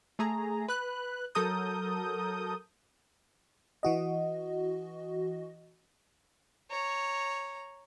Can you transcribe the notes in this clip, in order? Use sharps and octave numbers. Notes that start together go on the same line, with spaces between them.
A3 G#4 A#5
B4 F#6
F#3 A4 A#4 D#6 G6
E3 F#4 D#5
C#5 A#5